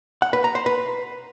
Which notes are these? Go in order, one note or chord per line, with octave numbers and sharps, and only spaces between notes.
F#5
B4
A#5
C5
B4